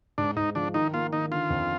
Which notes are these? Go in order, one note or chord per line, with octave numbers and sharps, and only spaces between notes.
G#2 D4
G#2 D#4
F3 D4
D#3 D#4
A#3 F4
D#3 D#4
D3 F4
F2